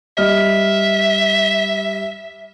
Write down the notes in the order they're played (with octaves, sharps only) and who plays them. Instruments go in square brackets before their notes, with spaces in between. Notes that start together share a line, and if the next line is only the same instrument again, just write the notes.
[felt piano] G3 D#5 F6 [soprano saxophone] E5